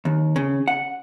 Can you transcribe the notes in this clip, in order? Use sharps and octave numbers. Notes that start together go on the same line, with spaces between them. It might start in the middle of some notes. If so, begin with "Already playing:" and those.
D#2
C#3
F#5